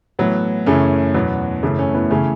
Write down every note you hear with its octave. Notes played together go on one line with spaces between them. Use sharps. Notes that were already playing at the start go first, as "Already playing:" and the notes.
A2 E3 F#3 B3
F#2 C#3 E3 A3 C#4
E2 B2 F#3 B3
F#2 C#3 E3 A3
A3 C#4
B3 E4
C#3 E3 A3 C#4